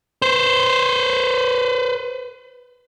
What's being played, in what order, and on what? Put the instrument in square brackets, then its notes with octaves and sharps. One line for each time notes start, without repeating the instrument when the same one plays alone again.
[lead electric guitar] B4 C5